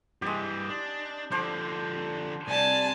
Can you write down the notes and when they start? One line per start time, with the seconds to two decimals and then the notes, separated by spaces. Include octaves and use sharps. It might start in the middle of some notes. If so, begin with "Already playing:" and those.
0.22 G2 E3 G#3 G4
0.69 D4
1.32 D3 F3 D4 C5
2.48 C2 C3 D5 G#5 A5